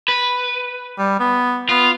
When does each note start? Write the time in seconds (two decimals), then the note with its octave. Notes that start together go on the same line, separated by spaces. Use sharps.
0.08 B4
0.98 G3
1.19 B3
1.69 B3 F4